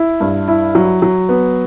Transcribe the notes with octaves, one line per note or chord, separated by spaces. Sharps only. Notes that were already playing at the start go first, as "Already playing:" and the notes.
Already playing: E4
G2
E4
F#3
F#3
B3